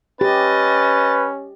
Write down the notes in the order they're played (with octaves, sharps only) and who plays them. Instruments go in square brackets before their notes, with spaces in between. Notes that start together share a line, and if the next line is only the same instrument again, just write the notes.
[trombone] C#4 [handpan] G4 [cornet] B4 [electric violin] D#5 A6